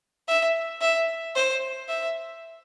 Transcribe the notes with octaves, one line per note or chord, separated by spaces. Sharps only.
E5
E5
C5
E5